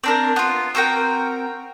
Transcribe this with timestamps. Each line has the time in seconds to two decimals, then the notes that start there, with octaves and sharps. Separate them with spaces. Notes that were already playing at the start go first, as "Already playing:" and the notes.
0.04 C4 D4 A#4
0.36 B3 F4
0.75 C4 F#4 A#4 G5